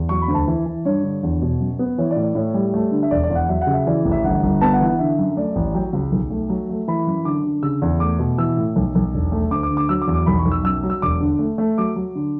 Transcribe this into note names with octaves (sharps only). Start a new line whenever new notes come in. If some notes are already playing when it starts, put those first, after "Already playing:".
Already playing: E2
F#3 C#6
B5
D2
A5
E3
E3
G2 C#5
D3
E2
B2
F#2
B3
E3 C#5
D5
A2
D5
A2 C#5
G3
A3
D3
E5
E1 D5
D5
E2
F#5
F#3 E5
F#5
C#3
E5
E3 D5
A1
E5
G1 F#5
G1
B3 A5
F#5
E3
F#5
D3 E5
F#2
A3 D5
A1
F#3 G5
C#2
B1
A3
F#3
A3
E3 B5
F#2
D3 D6
D3
C#3 E6
E2
A3 D6
B2
E3 E6
A2
B1
B1
E1
A3
D2 D6
D6
D3
D6
F#3 E6
D6
E2
D6
B1 B5
C#6
B1
E6
F#2 E6
F#3
E6
E1 D6
D3
A3
A3
F#3 D6
F#3
D3